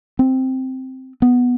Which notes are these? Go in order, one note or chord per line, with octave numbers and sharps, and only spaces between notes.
C4
B3